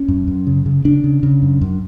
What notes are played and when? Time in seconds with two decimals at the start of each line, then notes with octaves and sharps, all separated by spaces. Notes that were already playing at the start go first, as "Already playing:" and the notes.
Already playing: C#4
0.08 F#2
0.27 F#2
0.47 C#3
0.66 C#3
0.85 C#3 D4
1.04 C#3
1.23 C#3
1.42 F#2
1.61 F#2